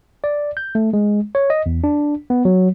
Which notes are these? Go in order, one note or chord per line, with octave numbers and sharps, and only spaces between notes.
D5
G6
A3
G#3
C#5
D#5
E2
D4
B3
F#3